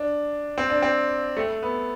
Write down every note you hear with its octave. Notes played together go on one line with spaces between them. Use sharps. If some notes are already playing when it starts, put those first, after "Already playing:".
Already playing: D4
C4
D4
C4
A3
B3